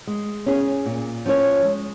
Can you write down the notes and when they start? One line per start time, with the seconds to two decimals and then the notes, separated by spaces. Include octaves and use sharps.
0.07 G#3
0.46 C#4 G#4
0.86 A#2
1.26 F3 C#4 G#4 C#5
1.65 G#3